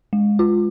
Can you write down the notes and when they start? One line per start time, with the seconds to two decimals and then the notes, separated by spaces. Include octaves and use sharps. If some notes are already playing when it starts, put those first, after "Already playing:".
0.13 G#3
0.39 F4